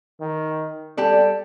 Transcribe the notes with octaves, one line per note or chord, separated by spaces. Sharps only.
D#3
G3 G4 A4 D5